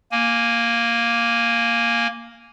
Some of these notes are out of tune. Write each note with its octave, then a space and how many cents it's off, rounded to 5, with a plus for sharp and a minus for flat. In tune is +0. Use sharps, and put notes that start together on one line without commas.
A#3 +0 G#5 +0